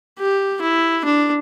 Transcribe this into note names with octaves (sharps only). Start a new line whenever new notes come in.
G4
E4
D4